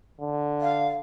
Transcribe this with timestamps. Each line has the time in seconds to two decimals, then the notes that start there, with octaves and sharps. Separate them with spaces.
0.20 D3
0.61 F5